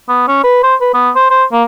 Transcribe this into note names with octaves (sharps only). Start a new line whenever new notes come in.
B3
C#4
B4
C5
B4
B3
C5
C5
A#3